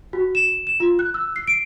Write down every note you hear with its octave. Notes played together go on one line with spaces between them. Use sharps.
F#4
E7
E7
F4
F#6
E6
C7
D7